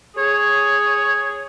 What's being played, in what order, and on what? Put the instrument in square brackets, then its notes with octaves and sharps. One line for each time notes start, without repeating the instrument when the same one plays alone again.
[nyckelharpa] G#4 [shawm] C#5